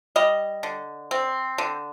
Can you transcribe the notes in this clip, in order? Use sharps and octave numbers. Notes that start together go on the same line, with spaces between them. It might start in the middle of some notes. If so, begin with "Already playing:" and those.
G3 D#5
D3
C4
D3